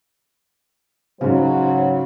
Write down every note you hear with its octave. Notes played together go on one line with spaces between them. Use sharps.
G#2 C#3 F#3 C5